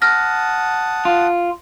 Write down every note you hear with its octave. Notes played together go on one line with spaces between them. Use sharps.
F#5 A5 D#6 F6 A#6
F4